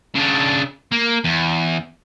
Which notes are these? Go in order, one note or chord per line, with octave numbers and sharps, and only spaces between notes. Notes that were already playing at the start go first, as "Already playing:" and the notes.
C#3 D4
A#3
E2